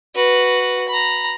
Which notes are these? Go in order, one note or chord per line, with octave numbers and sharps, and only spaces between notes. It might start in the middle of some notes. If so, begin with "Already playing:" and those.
F#4 B4
A#5 B5